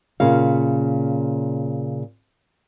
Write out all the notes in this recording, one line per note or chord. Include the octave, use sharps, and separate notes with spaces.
A#2 C#3 F5